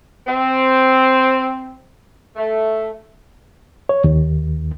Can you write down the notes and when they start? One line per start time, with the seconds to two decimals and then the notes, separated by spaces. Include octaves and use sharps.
0.27 C4
2.36 A3
3.89 C#5
4.04 D#2